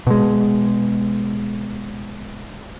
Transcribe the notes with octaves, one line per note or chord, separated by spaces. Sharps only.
B2 G#3